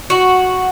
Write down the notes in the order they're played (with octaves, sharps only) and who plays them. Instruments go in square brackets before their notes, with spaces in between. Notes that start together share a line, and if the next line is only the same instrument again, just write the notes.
[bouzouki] F#4